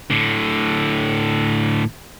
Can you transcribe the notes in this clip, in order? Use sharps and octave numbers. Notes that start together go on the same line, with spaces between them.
A2 D3